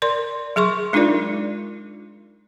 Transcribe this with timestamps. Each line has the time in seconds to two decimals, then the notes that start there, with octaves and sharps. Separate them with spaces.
0.02 A#4 D5 C6
0.56 F#3 G#4 C6 C#6
0.93 G#3 D4 D#4 F4 A#4 D5